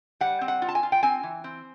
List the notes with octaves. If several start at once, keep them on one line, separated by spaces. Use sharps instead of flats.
G3 F#5
C4
F#5
F4
A5
G#5
F4
G5
C4 G#5
E3
C4